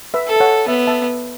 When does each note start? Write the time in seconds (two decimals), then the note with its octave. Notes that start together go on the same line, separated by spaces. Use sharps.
0.14 B4 E5
0.28 A4
0.36 E5
0.40 C#5 F#5
0.67 B3 E5 A5
0.87 E5 A5